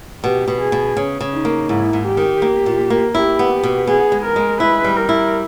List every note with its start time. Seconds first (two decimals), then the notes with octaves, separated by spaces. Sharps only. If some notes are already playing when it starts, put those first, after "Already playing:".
0.23 B2 G4
0.48 B2
0.60 G#4
0.72 B2
0.97 C#3
1.21 C#3
1.33 D#4
1.45 A#3
1.69 G#2 E4
1.93 G#2
2.06 G4
2.17 D#3
2.42 A#3
2.66 A#2
2.90 A#3
3.15 E4 G4
3.39 B3
3.63 B2
3.87 B3 G#4
4.12 G#3
4.24 A#4
4.36 G#3
4.60 E4 B4
4.84 G3
4.96 A#4
5.09 E4